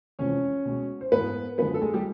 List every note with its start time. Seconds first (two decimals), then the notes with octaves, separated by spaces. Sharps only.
0.19 E2 C3 F3 G#3 C#4 C#5
0.66 B2 G#3
1.01 C5
1.12 G#2 E3 G#3 B3 B4
1.58 F#2 D3 F3 G#3 B3 B4
1.74 A4
1.82 G#3 G#4
1.93 G3 G4